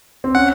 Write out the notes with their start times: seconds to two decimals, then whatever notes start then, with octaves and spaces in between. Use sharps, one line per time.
0.24 C4
0.34 C#4 F#5